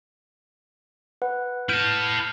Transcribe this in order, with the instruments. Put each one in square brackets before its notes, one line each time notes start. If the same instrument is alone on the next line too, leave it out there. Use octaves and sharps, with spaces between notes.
[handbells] B4 F#5
[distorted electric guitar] E4 A5 [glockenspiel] F6 G6 D#7